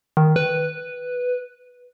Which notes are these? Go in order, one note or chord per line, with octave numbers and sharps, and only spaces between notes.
D#3
B4